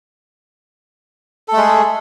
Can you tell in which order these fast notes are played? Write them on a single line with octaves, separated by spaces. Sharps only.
A4 A3 G#3 G#4